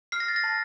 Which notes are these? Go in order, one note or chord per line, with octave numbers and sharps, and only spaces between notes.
F6 C7
A#6
A6
A#6
A5